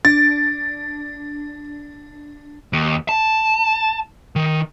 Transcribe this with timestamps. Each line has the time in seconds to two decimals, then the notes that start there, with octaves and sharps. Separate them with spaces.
0.05 D4 A6
2.73 D#2
3.09 A5
4.36 D#3